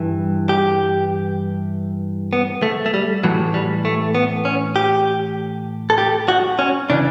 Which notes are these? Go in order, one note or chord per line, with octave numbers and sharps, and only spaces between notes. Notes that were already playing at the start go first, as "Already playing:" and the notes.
Already playing: G2 E3
G4
B3
A3
A3
G3
A2 E3 F#3
G3
A3
B3
C#4
G4
A4
G4
F#4
C#4
C#3 E3 D4